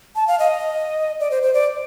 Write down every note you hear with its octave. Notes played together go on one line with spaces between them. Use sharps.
A5
F5
D#5
D5
C5
C5
D5